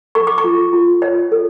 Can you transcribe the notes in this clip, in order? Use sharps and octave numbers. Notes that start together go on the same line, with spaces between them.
A4 C#6
D6
C#6
F4
F4
C#5
A4